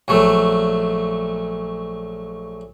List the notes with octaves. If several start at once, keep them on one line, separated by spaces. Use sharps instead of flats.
A#1 F#3 A3